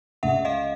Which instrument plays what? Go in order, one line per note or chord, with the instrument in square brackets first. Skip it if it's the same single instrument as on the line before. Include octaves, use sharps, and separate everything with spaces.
[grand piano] C#2 [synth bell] E5 F#5
[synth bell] D#5 F5